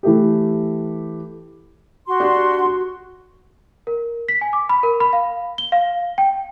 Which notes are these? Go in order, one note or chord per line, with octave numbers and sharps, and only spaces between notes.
E3 A3 G4
F#4 C6
D4 G4
F#4
A#4
B6
G#5
D6
B5
A#4
B5
F5
G7
F5
G5